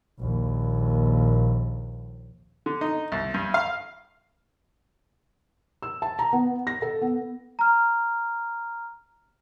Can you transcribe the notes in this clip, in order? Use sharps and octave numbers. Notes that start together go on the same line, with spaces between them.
A#1 D#2
D3
D#4
C2
G2
F5
E6
A5
A#5
B3
A#6
A4
B3
A#5 F6